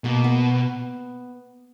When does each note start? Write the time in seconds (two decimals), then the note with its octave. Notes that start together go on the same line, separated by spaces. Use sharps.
0.04 B2 A#3
0.24 B3